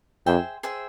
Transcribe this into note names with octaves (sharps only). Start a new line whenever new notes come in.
F2 G#4 C5 E5 G5
G#4 C5 E5 G5